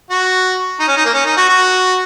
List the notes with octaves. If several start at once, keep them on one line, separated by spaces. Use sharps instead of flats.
F#4
D#4
C#4
D#4
A#3
C#4
D#4
F#4
F#4